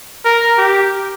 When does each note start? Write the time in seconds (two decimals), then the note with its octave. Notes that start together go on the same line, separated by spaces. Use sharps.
0.25 A#4
0.58 G4